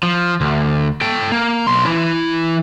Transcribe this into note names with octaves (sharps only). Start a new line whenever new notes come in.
F3
D2
A4 G5
A#3
B1 C6
E3 E4